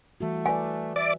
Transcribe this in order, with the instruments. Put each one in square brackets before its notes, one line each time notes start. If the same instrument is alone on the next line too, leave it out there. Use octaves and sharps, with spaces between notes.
[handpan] E3 G3 F#4 [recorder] A3
[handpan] B4 D5 [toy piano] G#5
[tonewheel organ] D5 D6 [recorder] E5